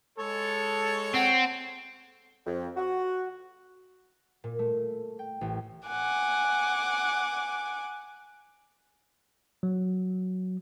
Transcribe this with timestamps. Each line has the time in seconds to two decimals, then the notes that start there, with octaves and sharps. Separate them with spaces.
0.18 G#3 A4 C#5
1.14 C4 F#5
2.46 F2
2.77 F#4
4.44 A#2
4.59 A3
5.19 G5
5.41 A1
5.88 F#5 G#5 D6
9.63 F#3